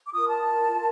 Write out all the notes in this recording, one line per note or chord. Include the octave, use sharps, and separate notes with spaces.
D6
F4 A#4 D#6
A5
F4 A#4